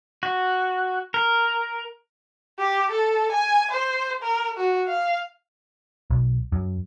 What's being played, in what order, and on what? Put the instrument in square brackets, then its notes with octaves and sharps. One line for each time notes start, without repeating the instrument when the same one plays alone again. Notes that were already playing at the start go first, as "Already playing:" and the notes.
[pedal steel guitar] F#4
A#4
[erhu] G4
A4
G#5
C5
A#4
F#4
F5
[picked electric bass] B1
F#2